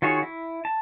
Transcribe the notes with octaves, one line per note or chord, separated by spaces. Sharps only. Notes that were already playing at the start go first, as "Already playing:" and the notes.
D#3 F4 F#4 G#4 C#5
E4
A5